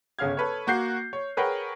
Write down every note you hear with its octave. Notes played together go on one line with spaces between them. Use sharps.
G1 C#3 C#4 F5 F6 G#6
A4 B4 C#5
A#3 F#4 G6 C7
C#5
G#4 A#4 B4 C#5 F#5 G5